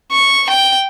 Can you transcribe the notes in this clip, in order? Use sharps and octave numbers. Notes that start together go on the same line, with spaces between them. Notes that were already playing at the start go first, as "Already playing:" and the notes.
C#6
G5